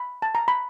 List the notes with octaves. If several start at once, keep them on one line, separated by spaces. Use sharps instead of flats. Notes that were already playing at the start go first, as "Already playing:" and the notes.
Already playing: B5
A5
A#5
B5